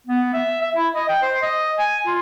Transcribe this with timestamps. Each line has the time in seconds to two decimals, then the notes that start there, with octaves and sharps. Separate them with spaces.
0.07 B3
0.34 E5
0.62 E5
0.76 E4
0.95 D#5
1.09 G5
1.22 C5
1.42 D#5
1.78 G#5
2.06 F4